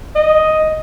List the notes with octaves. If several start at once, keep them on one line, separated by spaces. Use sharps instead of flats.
D#5